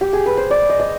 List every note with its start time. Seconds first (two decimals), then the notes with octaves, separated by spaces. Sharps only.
0.01 G4
0.13 G#4
0.26 B4
0.37 C5
0.51 D5
0.69 D#5
0.80 D#5